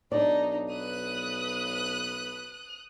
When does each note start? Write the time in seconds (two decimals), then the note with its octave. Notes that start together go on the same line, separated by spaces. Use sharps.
0.12 B1 D4 D#4 D5
0.71 B4 D#6 F#6